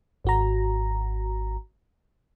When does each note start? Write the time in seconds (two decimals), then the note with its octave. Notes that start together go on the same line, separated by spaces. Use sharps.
0.24 G#1 F#4 A#5